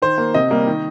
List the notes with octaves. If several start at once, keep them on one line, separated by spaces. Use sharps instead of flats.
D#3 C5
A#3
C3 D#5
G3 A#3
D#3